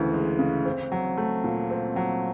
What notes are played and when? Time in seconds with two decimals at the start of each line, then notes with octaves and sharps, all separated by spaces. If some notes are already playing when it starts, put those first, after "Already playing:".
Already playing: D2 C#3 E3 G#3
0.13 G#3
0.39 C#3
0.66 C4
0.92 F#3
1.18 A3
1.44 A#2
1.70 C4
1.96 F#3